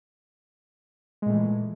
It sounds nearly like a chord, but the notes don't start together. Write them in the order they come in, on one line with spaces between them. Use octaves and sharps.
G#3 A#2 A3 E3